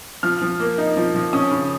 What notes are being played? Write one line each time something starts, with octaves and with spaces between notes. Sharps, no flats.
F3 F6
F3
A#3
D#4
F3
F3
C#4 D#6
C#3